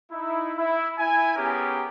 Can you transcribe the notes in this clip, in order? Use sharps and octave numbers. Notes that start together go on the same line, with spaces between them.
D#4 E4
E4
E4 G#5
B3 C#4 G4 G#4 A#4